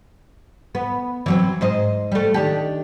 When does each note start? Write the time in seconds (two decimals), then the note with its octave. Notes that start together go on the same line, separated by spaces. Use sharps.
0.75 B3
1.26 E3 F#3 C4
1.61 G#2 C5 D#5
2.12 G3 A3
2.34 D#3 D4 G4